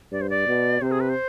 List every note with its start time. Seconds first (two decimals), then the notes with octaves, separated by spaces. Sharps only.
0.12 G2 D5
0.21 C5
0.30 D5
0.47 B2
0.82 C3 C5
0.91 G#4
1.00 B4
1.09 C5